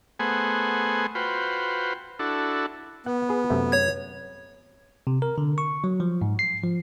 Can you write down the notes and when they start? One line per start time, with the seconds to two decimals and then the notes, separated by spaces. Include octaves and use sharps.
0.19 A3 B3 G#4 C5 F#5 G#5
1.15 F4 F#4 B4 C5 G5
2.19 D4 E4 F#4 A4
3.06 B3 F#5
3.29 G#4 B4
3.50 F#2 C3 A3
3.72 C#5 G#6
5.07 C3
5.22 A#4
5.38 D3
5.58 C#6
5.84 F#3
6.00 F3
6.22 G#2
6.39 C7
6.64 F3